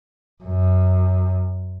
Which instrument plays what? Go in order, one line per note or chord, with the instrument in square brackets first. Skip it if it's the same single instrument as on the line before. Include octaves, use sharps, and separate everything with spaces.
[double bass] F#2